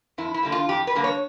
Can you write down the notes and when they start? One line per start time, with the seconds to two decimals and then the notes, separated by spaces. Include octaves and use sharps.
0.18 F2 E4
0.34 E4
0.43 D3 G3 A#3
0.52 F4
0.69 F2 G4
0.87 B4
0.95 D3 G3 A#3
1.04 C#5